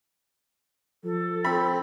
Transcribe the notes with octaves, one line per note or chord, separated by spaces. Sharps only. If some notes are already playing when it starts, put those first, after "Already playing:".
F3 A4
C4 B5